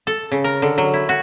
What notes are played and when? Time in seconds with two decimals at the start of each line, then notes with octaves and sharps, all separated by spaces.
0.07 A4
0.32 C#3
0.44 A#4
0.62 D3
0.78 F#3
0.94 E4
1.09 F#4